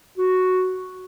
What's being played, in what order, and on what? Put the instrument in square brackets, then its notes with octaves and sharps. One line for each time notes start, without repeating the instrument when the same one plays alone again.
[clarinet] F#4